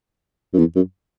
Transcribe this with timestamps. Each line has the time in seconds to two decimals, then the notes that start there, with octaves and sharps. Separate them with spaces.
0.54 F#2
0.58 E2
0.76 F#2